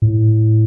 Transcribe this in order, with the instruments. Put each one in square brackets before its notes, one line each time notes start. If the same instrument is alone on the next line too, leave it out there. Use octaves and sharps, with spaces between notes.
[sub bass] A2